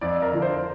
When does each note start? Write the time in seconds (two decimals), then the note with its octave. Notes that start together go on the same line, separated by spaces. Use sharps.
0.01 F2 D5
0.22 A#4
0.32 D3 F3
0.42 C5